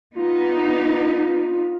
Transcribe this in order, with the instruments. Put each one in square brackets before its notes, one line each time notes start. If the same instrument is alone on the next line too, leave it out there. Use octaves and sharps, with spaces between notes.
[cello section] B3 D4 D#4 [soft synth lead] F4